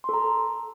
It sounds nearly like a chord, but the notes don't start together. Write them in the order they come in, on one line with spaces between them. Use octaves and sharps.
C6 A4 A#5